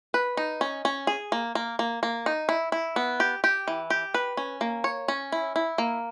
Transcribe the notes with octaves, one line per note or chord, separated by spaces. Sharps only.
B4
D#4
C#4
C#4
G#4
A#3
A#3
A#3
A#3
D#4
E4
E4
B3
G4
G4
E3
G4
B4
C#4
A#3
C#5
C#4
E4
E4
A#3